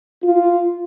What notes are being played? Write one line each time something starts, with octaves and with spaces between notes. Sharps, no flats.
F4